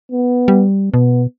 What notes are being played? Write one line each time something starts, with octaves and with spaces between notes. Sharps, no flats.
B3
G3
B2 B3